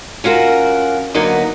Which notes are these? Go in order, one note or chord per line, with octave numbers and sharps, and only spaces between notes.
C#4 F4 F#4 A#4
D3 F#3 A#3 B3 D#4